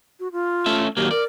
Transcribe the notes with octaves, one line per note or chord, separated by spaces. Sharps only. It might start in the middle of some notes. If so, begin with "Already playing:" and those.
F#4
F4
A3 C#4 E5
D#2 F#3 A#3 G4
A#4 D5